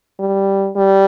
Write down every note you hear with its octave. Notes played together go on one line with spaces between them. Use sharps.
G3
G3